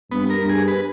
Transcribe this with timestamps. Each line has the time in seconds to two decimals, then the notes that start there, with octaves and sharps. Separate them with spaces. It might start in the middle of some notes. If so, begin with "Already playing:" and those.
0.11 G2 B3
0.30 A#4
0.39 G2
0.50 G#4
0.68 B4